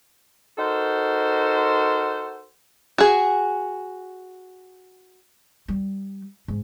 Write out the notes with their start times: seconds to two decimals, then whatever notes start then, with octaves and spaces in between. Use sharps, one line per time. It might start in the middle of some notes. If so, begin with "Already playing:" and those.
0.58 D#4 F#4 A4 A#4 C5
2.98 F#4 G#4
5.68 G3
6.48 G#2